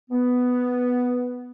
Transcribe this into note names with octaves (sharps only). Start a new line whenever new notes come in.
B3